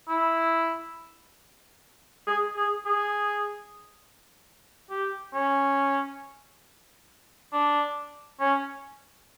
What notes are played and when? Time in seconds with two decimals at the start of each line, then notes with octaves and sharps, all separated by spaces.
0.08 E4
2.27 G#4
2.57 G#4
2.86 G#4
4.90 G4
5.34 C#4
7.53 D4
8.40 C#4